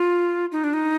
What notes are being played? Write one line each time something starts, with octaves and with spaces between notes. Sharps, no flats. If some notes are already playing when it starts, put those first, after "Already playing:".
Already playing: F4
D#4
D4
D#4